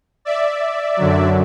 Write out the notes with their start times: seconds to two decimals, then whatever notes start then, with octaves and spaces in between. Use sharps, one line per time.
0.25 D5 E5
0.97 F#2 D3 F#3